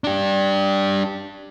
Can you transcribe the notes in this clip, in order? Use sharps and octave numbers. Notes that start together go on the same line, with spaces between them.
D4 G4